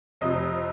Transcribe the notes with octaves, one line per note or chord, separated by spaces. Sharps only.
F1 F2 C3 D#5